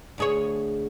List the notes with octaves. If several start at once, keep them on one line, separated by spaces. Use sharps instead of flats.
D2 G#4 C#5